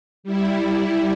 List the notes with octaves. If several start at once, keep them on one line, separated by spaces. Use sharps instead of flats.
G3 E4